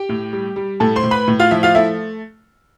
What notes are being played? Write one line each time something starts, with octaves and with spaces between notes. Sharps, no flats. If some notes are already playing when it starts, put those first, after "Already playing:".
Already playing: G4 G5
A2
G3
G3
A2 A4 A5
C5 C6
A2
B4 B5
A2
F4 F5
F3 E4 E5
F4 F5
A3 E4 E5